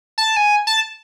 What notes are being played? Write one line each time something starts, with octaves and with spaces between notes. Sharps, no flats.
A5
G#5
A5